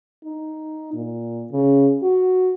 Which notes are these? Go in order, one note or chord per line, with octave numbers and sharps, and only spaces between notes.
D#4
A#2
C#3
F#4